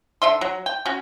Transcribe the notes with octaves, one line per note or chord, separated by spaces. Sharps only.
D3 E5 C6
F#3
G5
C#4 F#4